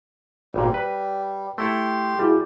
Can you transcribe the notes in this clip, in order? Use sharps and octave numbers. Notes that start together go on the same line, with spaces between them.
G#1 A#2 G3
B4
A3 E4 G4 A4 C6
G3 E4 F#4 G#4